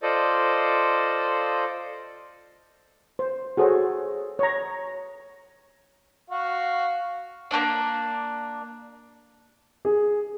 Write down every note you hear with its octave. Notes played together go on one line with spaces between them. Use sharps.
F4 A4 C5 D5 D#5
C5
F#4 G#4 A4 C5 C#5
C#5 A#5
F#4 F5
A#3 C#4 D4 D5
G#4